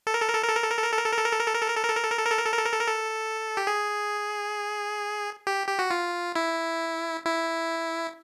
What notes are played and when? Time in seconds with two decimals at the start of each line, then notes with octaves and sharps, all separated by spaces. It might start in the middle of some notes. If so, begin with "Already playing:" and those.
0.07 A4
0.14 A#4
0.21 A4
0.28 A#4
0.35 A4
0.42 A#4
0.49 A4
0.56 A#4
0.63 A4
0.70 A#4
0.78 A4
0.84 A#4
0.92 A4
0.97 A#4
1.05 A4
1.12 A#4
1.18 A4
1.26 A#4
1.33 A4
1.40 A#4
1.47 A4
1.55 A#4
1.61 A4
1.68 A#4
1.76 A4
1.83 A#4
1.90 A4
1.97 A#4
2.04 A4
2.11 A#4
2.18 A4
2.25 A#4
2.32 A4
2.38 A#4
2.45 A4
2.52 A#4
2.59 A4
2.66 A#4
2.73 A4
2.81 A#4
2.87 A4
3.57 G4
3.67 G#4
5.47 G4
5.67 G4
5.79 F#4
5.91 F4
6.36 E4
7.25 E4